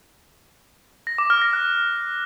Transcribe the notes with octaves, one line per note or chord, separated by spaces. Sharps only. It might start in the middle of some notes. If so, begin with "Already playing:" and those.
A#6
D6
F6
A#6
F#6